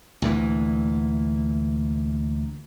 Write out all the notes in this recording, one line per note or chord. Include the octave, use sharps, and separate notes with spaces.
D2 A#2 E3